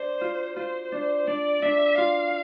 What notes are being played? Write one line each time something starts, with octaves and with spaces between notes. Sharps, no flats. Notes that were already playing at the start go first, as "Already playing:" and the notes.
Already playing: D4 C5
F4
F4 C5
D4
D4 D5
D4 E5
F4 F5